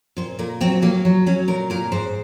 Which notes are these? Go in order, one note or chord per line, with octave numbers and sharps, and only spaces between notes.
A#2 C5
A#2 A#4
F#3 C4
F#3 A#3
F#3
F#3 C#4
A#2 A#4
A#2 A#4
G#2 C5